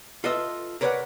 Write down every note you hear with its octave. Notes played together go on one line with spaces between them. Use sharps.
F4 A4 B4 D#5 E5
A#4 B4 C#5 D5 E5 F#5